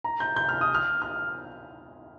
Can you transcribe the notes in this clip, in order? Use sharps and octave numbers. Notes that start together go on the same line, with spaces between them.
A#5
G6
G6
F6
D#6
F6
F6